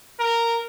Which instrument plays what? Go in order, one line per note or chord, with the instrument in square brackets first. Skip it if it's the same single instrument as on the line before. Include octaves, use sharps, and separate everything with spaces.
[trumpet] A#4